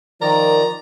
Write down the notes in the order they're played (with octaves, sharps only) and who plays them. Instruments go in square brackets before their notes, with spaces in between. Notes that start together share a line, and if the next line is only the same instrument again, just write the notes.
[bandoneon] D#3 D5 [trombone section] F3 A#4 [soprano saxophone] A#5